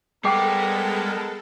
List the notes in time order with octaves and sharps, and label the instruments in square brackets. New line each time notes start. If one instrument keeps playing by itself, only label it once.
[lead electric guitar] G3 [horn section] G#3 B3 A#4 [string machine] A4 [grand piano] G5 D6 C7